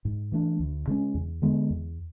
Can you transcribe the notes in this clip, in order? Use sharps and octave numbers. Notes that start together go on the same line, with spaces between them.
G#2
E3 A3 D4
D2
C#3 G#3 C#4
E2
D3 G#3 B3
E2